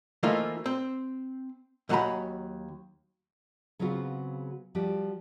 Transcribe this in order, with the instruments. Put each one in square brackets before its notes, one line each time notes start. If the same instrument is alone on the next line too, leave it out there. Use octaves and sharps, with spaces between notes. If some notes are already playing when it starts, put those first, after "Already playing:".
[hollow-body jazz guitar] E3 F3 A3 A#3 D#4 F4
C4
D#2 F#3 F#5 G#5 A#5 B5
[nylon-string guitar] C#3 F#3 B3 C4 F4 F#4
F3 G3 F#4 G4